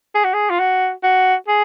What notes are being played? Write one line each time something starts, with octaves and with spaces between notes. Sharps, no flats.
G#4
F#4
G#4
F4
F#4
F#4
G#4